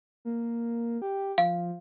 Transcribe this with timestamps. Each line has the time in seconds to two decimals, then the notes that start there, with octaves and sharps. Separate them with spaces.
0.25 A#3
1.02 G4
1.38 F3 F5